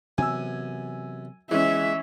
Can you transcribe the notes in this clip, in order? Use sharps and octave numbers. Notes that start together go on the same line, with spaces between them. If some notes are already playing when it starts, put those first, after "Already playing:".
F#2 C3 E3 B3 G#5 E6
E3 G#3 C#4 E5